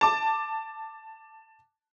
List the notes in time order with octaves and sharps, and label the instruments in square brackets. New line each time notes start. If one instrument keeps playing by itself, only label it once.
[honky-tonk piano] A5 D6